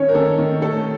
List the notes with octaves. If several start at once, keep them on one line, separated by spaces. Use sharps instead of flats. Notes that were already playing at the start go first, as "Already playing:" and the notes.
Already playing: D#3 C#4 C#5
A#4
D#3 A4
D#3
A3 A4